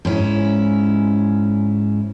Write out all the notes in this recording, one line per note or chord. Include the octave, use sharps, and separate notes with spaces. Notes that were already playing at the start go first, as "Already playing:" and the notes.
G#2 C#4 E4